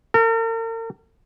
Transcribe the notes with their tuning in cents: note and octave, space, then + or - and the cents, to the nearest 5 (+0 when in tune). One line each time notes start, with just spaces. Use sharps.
A#4 -45